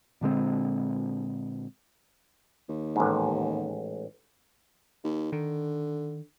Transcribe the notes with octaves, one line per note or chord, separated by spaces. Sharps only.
A#2 D3 G#3 C4
D#2
A1 G#2
D#2
D3 D#3